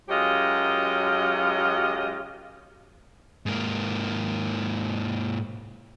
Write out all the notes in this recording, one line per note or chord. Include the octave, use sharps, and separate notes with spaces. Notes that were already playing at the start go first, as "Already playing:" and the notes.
F#2 F#3 G#3 F4 G4 D#5
G#2 A#3